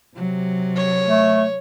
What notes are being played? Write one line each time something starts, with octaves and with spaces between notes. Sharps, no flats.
C3 F#3
C#5
A3